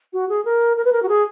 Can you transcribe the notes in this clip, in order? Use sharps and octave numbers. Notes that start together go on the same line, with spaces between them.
F#4
G#4
A#4
A#4
B4
A#4
F#4
G#4